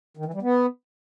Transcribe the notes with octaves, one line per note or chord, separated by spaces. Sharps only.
D#3
E3
G3
B3